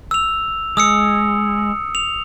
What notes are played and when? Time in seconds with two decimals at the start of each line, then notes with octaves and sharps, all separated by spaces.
0.11 E6 F7
0.77 G#3 D#6 E6 C#7
1.95 F7